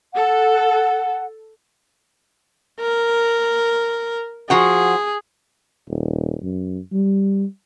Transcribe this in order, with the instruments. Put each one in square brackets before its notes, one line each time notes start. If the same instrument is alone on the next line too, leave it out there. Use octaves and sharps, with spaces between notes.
[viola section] A4 [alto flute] F#5
[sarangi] A#4
[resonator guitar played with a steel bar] F3 F#4 F#5 [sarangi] G#4
[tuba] D#1
F#2
G3